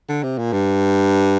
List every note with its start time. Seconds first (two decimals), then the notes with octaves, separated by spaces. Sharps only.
0.09 D3
0.23 C3
0.38 A#2
0.53 G2